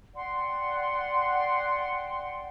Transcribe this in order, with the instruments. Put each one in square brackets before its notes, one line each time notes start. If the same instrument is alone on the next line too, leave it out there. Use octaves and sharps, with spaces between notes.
[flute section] D5 F#5 G5 C6